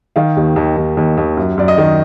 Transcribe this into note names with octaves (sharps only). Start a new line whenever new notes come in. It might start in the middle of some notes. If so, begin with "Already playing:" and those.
D#3 F5
D#2
D#2
D#2
D#2
D#2
F#2
F#2 D5
D#5
D#3